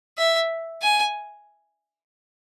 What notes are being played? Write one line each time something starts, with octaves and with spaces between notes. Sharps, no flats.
E5
G#5